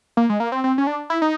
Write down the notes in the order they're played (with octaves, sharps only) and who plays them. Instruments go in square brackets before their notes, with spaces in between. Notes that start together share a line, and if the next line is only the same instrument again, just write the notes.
[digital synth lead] A#3
G#3
A#3
C4
C4
C#4
D4
E4
D#4